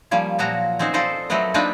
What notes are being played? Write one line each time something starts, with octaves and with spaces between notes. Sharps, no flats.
F3 G3 A#3 C#4
A#2 F3 F#3 F#4 A#5
C4 C#4 D#4 F#4 C5
F4 A4 C5 D5 D#5
F#3 A3 C4 A#4 B4 D#5
A#3 C4 D4 D#4 F4 B4